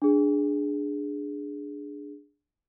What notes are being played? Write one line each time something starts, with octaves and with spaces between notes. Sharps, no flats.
D4 G#4